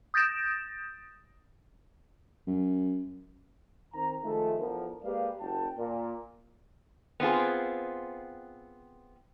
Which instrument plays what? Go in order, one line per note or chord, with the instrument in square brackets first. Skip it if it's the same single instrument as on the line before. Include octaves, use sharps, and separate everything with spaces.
[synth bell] D#6 G6 A6 A#6 D7 E7
[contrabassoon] F#2
[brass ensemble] D#3 C4 A#4 A#5
D#3 F3 G#3 A3
E2 D3 F3 B3 A#4
G#3 A#3 G4 B4 D5 F5
F#1 F#4 G5 A5
A#2
[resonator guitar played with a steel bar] B3 C4 F4 G#4